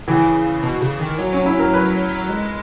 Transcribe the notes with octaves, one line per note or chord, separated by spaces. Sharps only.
C#3 E3
B2
C#3
D#3
F#3
C#4
E4
A#4
B4
G#3